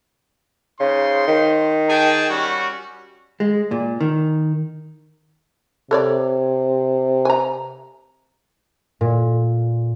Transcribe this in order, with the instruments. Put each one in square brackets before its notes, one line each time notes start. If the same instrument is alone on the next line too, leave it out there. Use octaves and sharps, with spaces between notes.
[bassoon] C#3 [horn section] D#4 C5 C6
[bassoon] D#3
[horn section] G#4 G5 A5
G3 C#4 F#4
[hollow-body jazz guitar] G#3
A#2
D#3
[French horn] C3 [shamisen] A4 C#5 D5
[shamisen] G#5 A#5
[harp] A#2